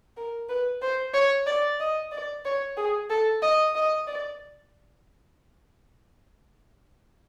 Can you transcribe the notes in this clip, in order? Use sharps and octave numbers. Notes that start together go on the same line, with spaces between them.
A#4
B4
C5
C#5
D5
D#5
D5
C#5
G#4
A4
D#5
D#5
D5